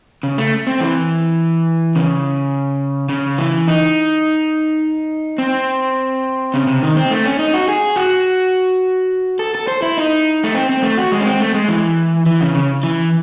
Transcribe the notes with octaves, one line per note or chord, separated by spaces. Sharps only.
C#3
A3
C4
E3
C#3
C#3
E3
D#4
C4
C#3
C3
D#3
C4
A3
C#4
D#4
F#4
G#4
F#4
A4
A4
C5
E4
D#4
A3
C4
C4
A3
F#4
G#3
C#4
C4
A3
G#3
E3
E3
C#3
C#3
E3